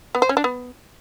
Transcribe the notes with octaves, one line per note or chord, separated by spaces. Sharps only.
B3
C5
C#4
D4
B3